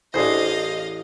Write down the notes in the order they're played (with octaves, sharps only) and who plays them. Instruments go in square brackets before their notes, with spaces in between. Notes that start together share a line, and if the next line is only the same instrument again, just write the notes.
[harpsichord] A1 E2 [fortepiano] D4 G#4 C5 [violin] D#5 F5